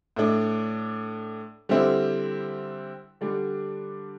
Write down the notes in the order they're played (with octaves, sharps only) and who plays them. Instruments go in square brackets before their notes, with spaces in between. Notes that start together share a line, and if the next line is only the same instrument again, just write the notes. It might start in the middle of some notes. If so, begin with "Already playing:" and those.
[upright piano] A2 A3 D4
D3 G3 C4 E4
D3 G3 D4